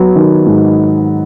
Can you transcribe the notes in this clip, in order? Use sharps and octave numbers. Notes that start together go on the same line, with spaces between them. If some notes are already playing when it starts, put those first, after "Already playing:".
Already playing: F#3 B3
D#3
G#2